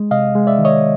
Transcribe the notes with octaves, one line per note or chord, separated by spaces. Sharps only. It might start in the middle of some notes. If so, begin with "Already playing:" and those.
Already playing: G#3
C3 D#5 F5
G#3
D5 E5
D#3
C#5 D#5